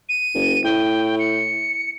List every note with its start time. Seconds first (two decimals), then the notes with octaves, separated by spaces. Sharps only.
0.09 D#7
0.35 F#1
0.64 A2 G5
1.19 C#7